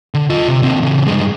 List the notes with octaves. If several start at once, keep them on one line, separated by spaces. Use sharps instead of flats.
D3
F4 D#5
C3
D#2 C4
C#3 E3
G2 G#3